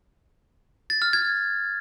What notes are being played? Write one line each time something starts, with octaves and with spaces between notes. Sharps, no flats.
A6
F6
G#6